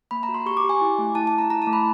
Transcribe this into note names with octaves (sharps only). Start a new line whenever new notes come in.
A#3 B5
A#5
F#4
C6
G4 C#6
D6
G4
G#5
E4
A3
E4 A5
A3 A5
A#5
E4 A#5
A5
A3
B5